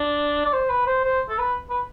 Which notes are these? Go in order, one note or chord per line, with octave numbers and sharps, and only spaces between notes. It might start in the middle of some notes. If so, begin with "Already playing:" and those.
Already playing: D4
D5
C5
B4
C5
C5
A4
B4
B4